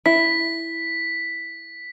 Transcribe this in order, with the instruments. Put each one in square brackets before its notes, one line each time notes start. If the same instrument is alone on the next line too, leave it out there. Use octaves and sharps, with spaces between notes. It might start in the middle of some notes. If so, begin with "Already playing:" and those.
[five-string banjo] E4 [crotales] B6